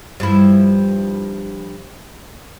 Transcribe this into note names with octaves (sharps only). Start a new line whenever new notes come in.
G2 F3 E4